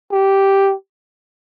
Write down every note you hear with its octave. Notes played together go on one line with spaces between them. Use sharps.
G4